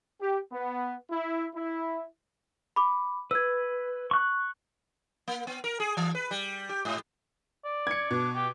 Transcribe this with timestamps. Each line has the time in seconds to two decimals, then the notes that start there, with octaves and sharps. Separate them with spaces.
0.20 G4
0.52 B3
1.11 E4
1.55 E4
2.76 B5 D6
3.31 B4 E6 G#6
4.11 C#6 F#6
5.28 A#3
5.47 B3
5.64 A#4
5.80 G#4
5.97 E3
6.15 B4
6.31 G3
6.69 G4
6.85 G#2
7.65 D5
7.87 G#6 C#7
8.11 B2 D4
8.35 G4